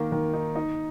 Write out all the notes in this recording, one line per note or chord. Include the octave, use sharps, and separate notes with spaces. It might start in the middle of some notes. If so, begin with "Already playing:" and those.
Already playing: D#3 A#3
D#3
D#4
D#4